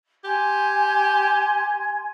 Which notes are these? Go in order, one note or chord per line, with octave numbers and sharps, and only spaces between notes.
G4 G#5 C6 G#6